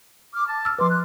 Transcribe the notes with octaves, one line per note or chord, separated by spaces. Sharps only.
D6 F6
A5
E6 F6
F3 B4 C6 D6
F#6